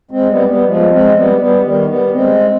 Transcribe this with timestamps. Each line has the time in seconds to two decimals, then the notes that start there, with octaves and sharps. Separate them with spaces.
0.11 G#3 C4
0.29 G3 B3
0.48 G3 B3
0.66 F3 G#3
0.90 G#3 C4
1.15 G3 B3
1.39 G3 B3
1.64 D#3 G3
1.88 G3 B3
2.13 G#3 C4